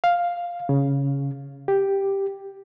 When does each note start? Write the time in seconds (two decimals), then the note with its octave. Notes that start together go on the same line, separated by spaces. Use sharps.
0.04 F5
0.69 C#3
1.68 G4